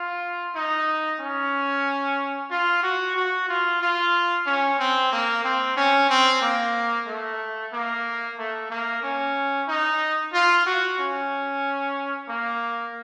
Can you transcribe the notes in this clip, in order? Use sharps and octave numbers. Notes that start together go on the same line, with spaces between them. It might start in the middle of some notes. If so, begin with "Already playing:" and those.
Already playing: F4
D#4
C#4
F4
F#4
F#4
F4
F4
C#4
C4
A#3
C4
C#4
C4
A#3
A3
A#3
A3
A#3
C#4
D#4
F4
F#4
C#4
A#3